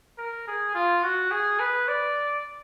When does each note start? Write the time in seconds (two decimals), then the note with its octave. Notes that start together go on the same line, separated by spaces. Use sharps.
0.18 A#4
0.48 G#4
0.75 F4
1.03 F#4
1.31 G#4
1.60 B4
1.88 D5